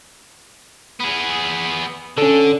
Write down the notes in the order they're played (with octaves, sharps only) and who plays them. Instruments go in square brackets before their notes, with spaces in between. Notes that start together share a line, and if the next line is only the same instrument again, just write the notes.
[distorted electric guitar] B3 G#4
[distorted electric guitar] D3 [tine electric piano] C#4 A4